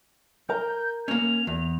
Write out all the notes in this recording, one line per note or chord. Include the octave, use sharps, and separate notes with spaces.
A#4 A#5 G6
A#3 C#4 F7
E2